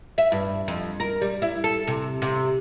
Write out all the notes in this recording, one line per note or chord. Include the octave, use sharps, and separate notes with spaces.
E5
G2
F2
A#4
G3
E4
A4
C3
C3